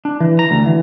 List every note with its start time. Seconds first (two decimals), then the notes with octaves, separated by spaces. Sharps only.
0.05 D4
0.20 E3
0.39 A#5
0.51 D2
0.66 E3